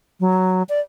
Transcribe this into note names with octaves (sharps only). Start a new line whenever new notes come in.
F#3
D5